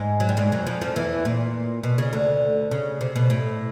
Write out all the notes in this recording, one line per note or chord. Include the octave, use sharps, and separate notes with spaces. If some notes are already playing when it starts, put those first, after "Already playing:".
Already playing: G#2 G#3
F#3
G3
G#2 G#3
F#2 F#3
F2 F3
F2 F3
E2 E3
A#2
B2
C#3
D2 D3
C#3
C3
B2
A2